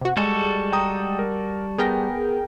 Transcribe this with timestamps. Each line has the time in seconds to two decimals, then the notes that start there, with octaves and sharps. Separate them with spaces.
0.01 C3 F#4
0.17 G3 G#3 F#4 A4 D5
0.72 G5 A#5 D#6
1.19 A#4
1.78 B3 G#4 A#4 G5 A#6